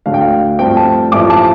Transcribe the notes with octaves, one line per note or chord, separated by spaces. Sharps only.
D2 D3 A3 F5
G5
F5
G2 F3 A3 C4 G5
A5
A1 G2 F3 A3 D6
A5